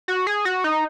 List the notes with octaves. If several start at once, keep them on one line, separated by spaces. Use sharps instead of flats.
F#4
G#4
F#4
D#4